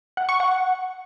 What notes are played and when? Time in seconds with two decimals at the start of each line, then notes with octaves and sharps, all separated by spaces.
0.17 F#5
0.29 C#6
0.40 F#5